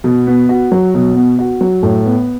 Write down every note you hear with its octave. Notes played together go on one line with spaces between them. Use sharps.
B2
B3
F#4
F#3
B2
B3
F#4
F#3
A2
B3